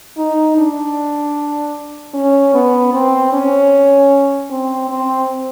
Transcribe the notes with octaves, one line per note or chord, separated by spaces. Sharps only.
D#4
D4
C#4
B3
C4
C#4
C4
C4